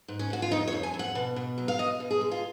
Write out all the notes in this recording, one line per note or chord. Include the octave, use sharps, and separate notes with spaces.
G#2
C#4
G#2 F#4
F4
F2 D#4
C#5
F2
G#5
F2
F#5
B2
B2
F#3
F5
B2 D#5
B2
G#4
G#3
F4